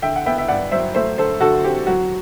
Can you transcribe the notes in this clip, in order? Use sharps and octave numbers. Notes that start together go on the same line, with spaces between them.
D3 E5 G5
F#5
B3 E5 G5
E5
G2 D5 F#5
F#3 C5 E5
A3 C5 E5
D3 A4 C5
D3 F#4 A4
C4 G4
F#3 F#4